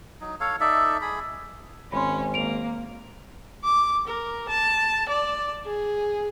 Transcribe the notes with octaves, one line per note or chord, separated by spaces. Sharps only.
F#3 D#4
A4 C#5 F5
D#4 A4 D5 E5
G#4 B5
G#1 C#4 B5 C6
A#3 D7 F7
D6
A#4
A5
D5
G#4